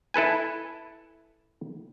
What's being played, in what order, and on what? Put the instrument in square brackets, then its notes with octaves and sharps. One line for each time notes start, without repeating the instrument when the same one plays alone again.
[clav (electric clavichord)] E4 A4 B4 G#5